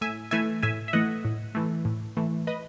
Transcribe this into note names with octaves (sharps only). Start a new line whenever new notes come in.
A2 E5 G#5
E3 A3 E5 G#5
A2 E5 G#5
E5
E3 A3 D#5 F#5
A2
E3 A3
A2
E3 A3
B4 D#5